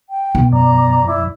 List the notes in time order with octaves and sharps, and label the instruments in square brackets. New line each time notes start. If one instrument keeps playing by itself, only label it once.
[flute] G5
[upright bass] B2
[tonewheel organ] F#2 D5 [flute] A#5
[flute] E4